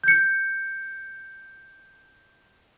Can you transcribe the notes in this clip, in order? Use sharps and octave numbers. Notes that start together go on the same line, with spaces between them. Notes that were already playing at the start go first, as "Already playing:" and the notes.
G6 C#7